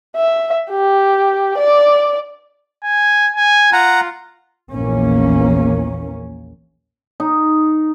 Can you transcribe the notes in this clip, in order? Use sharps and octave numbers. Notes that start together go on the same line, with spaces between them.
E5
G4
D5
G#5
G#5
F4 F#5 A#5
A#1 E2 A#3 C#4
D#4